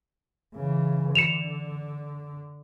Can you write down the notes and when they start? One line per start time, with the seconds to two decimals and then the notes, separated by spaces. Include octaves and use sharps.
0.55 C#3 E3
1.15 D3 C#7 E7 F7